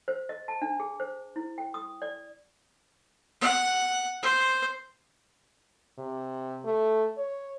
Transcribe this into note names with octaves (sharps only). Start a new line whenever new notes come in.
C5
D#5
A5
D4
G#4
C5
E4
G5
D#6
D5
F#5
C5
C3
A3
C#5